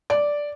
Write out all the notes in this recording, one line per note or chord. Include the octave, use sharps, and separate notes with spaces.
D5